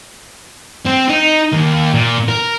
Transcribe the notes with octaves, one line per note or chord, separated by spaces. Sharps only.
C4
D#4
D#2
A#2
A#4